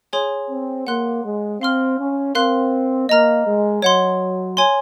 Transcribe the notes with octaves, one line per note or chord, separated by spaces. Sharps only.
G#4 C#5 G#5 C6
C4
A#3 F#5 C6 F#6
G#3
C4 F5 C6 F6
C#4
C4 A#4 F5 C6 F#6
A#3 D#5 A#5 F6
G#3
F#3 C#5 F#5 C6
C#5 G#5 C6